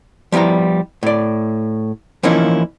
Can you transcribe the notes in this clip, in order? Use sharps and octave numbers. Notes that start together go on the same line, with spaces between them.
F3 G3 B3 E4 A#5
A2 D5
E3 F3 A#3 C#4 D#4 E4